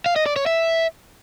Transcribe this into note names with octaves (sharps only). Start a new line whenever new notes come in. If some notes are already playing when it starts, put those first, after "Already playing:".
F5
D#5
D5
C#5
E5